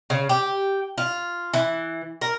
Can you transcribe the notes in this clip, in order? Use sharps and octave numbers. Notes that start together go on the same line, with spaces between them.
C#3
G4
F4
E3
A#4